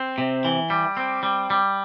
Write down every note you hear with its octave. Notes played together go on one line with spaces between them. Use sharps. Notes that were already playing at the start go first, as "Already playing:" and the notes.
Already playing: C4
C3
E3
G3
C4
G3
G3